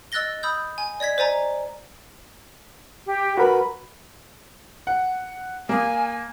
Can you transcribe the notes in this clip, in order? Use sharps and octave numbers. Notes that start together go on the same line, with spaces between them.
D#5 E6 F#6 A6 A#6 G7
B5 D#6 E6 G6
G#5
D5 D#5 G#6 B6
C5 D5 G#5 A#5
G4
F#4 A#4 B4 B5
F#5
A#3 G#5